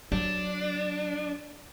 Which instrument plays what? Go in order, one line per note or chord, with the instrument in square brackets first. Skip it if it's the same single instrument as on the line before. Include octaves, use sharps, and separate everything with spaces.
[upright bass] F#3 [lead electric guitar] D4